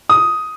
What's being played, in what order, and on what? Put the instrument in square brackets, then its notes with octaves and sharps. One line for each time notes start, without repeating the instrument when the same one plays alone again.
[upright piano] D#6